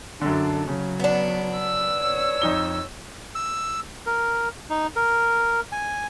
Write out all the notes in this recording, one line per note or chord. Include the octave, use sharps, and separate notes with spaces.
F#2 D3 D4 A4
C#3 F#3
B3 D4
E6
C#5
F2 D#4 G7
E6
A#4
D#4
A#4
G#5